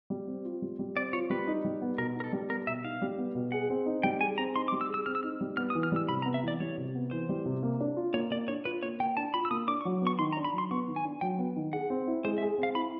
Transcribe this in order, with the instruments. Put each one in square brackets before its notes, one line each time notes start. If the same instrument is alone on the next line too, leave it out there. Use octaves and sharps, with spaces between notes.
[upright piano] G3
C4
F4
G3
G3
[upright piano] C4 [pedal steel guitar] D5
[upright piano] F4 [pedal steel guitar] C#5
[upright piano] G3 [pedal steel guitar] B4
[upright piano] D#4
G3
B3
[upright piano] B2 [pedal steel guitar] A#4
[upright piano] D#4 [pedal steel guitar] A#4
[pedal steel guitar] A4
[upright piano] G3
[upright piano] B3 [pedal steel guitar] A#4
[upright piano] B2 [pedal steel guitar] E5
[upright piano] D#4 [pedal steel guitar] F5
[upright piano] G3
B3
B2
[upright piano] G#4 [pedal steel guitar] F#5
[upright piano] C4
D#4
[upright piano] G3 [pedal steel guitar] G5
[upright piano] G#4 [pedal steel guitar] G#5
[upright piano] C4 [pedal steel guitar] A#5
[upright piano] D#4 [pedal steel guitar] C6
[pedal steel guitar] D6
[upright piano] G3
[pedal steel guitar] E6
[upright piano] G#4
[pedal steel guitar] E6
[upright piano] C4 [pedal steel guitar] F6
[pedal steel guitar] E6
[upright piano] D#4 [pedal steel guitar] F6
[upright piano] G3
[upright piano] B3 [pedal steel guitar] F6
[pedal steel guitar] D#6
[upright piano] E3
[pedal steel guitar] F6
[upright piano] G3 [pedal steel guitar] E6
[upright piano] C3 [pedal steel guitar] B5
[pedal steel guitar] A#5
[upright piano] B3
[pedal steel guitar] E5
[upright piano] E3 [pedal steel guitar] D5
[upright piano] G3 [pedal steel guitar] C#5
[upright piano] C3
B3
[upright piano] E3 [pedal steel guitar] C5
[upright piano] G3
C3
A#3
D4
F4
[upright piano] A#3 [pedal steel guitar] C#5
[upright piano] A#3 [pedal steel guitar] D5
[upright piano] D4 [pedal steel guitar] C#5
[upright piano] F4 [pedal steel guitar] B4
[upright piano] A#3 [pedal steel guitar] C#5
[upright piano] A#3 [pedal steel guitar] G5
[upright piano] D4 [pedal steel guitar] A5
[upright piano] F4 [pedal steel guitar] B5
[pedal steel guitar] E6
[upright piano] A#3 [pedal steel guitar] D#6
[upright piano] D4 [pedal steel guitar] D6
[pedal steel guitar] C#6
[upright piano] F#3
[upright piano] B3 [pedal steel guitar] C#6
[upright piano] D#3 [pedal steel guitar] C6
[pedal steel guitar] A#5
[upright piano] D4
[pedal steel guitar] B5
[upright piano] F#3 [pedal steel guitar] C6
[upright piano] B3 [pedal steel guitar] C#6
[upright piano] D#3
[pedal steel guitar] G#5
[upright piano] D4
[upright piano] F#3 [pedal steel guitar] G5
[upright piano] B3
D#3
[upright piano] G#4 [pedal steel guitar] F#5
[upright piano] C4
E4
[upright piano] G#3 [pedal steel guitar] C5
[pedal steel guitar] E5
[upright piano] G#4
[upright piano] C4 [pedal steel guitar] F5
[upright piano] E4 [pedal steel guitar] B5